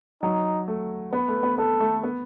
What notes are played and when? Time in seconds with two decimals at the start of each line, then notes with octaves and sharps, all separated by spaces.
0.22 F#3 D#4
0.68 A3
1.13 B3 B4
1.28 A3
1.43 B3
1.58 B3 A4
1.80 A3
2.03 B3